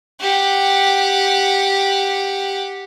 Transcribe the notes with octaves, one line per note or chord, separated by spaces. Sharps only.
G4 F#5